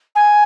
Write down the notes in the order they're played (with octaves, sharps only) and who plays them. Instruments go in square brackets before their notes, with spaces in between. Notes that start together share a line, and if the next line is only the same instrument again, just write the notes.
[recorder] G#5